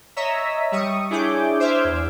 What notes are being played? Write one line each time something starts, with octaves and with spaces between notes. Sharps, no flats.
C#5 D#5 E5 A#5 E6 B6
G3 C#6 D#6
D4 E4 G#4 C#5 D6 G6
C5 E5 D6 F6 G6 G#6
E2